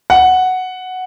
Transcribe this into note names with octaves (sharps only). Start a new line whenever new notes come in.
F#5